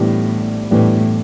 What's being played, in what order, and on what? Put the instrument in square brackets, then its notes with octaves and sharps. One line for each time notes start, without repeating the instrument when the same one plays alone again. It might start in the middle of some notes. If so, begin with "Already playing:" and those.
Already playing: [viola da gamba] A2 [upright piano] E3 G3 B3 D4
[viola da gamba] A2 [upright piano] E3 G3 B3 D4